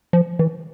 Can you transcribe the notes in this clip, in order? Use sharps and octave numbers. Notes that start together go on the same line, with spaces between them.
F3
E3